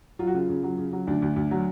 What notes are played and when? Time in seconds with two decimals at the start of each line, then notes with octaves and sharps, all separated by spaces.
0.19 F#3 F4
0.27 F#4
0.34 C#3 F4
0.49 C#3
0.63 F#3
0.78 C#3
0.93 F#3
1.07 D2 D4
1.22 D2
1.36 D2
1.51 F#3